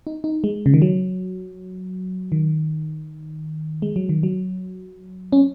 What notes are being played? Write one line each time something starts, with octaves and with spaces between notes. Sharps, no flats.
D#4
D#4
G#3
C#3
D#3
F#3
D#3
G#3
F#3
D#3
F#3
C#4